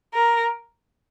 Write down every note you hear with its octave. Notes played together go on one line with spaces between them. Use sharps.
A#4